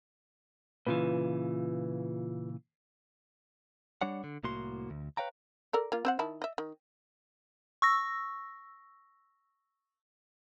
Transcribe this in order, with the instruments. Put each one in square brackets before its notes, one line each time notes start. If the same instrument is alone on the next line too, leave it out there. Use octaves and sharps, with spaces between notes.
[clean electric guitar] A#2 C#3 E3 [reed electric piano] F4 B4
[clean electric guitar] G3 D4 C#5 F#5
D3
C2 A2 A#3 F#4 C6
D2
B4 C#5 F5 G5 A#5
[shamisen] A4 A#4 D5
A#3 F4
C4 C5 F#5
D#3 E4 A5
D#5 E5
D#3
[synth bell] C#6 E6 A#6